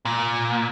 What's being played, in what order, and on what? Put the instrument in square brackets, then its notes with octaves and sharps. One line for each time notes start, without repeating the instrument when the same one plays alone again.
[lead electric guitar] A#2